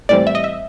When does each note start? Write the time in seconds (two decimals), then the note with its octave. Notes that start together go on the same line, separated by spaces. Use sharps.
0.09 A2 E3 G3 C4 D5
0.27 E5
0.35 D#5
0.44 E5